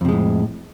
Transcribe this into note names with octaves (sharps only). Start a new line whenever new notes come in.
F2 A2 C3 G#3